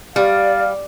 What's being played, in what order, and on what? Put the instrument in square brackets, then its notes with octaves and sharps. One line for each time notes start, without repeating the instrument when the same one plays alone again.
[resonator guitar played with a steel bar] G3 [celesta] G4 F6 [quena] D5 [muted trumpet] F5